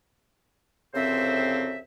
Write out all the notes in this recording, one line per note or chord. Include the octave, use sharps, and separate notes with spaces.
C2 F2 C#3 C4 C5 E5